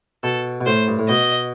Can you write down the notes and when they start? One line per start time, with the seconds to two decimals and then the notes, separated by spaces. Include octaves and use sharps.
0.23 B2 A4
0.61 B2
0.66 A2 C5
0.88 G2
0.99 A2
1.09 B2 D#5